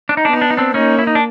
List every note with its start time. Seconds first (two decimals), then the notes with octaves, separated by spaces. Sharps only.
0.09 D4
0.17 D#4
0.25 B3 D4
0.33 D#4
0.41 D4
0.50 D#4
0.57 C4 D4
0.74 A#3 C#4 D#4
0.99 E4
1.07 D#4
1.15 D4